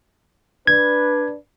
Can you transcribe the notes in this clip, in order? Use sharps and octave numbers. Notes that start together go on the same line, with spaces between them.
D4 B4 G#6